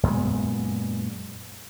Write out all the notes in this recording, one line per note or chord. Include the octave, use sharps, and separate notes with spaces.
F#2 A#2 G#3 B3